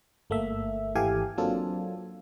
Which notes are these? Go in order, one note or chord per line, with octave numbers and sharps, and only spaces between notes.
G1 A3 A#3 E5
G#1 E3 G4 A4 F5 G#5
F#3 A#3 C4 D4 F4 A4